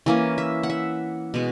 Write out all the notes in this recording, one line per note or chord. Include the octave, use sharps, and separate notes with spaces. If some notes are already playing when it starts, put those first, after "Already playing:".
E3 A#3 C#4
E5
F#5
E5
B2 G#3